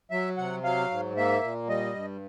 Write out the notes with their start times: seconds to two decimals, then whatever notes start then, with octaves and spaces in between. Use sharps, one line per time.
0.11 F#3 E5
0.38 C3 F#5
0.63 F#3 F5
0.91 G#2
1.17 A#3 E5
1.43 A#2
1.68 G3 D#5
1.95 G2